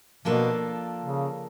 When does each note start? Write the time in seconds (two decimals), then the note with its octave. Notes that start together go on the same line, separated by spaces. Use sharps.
0.25 B2 F3 A#3 D4 F4 A4
1.04 C#3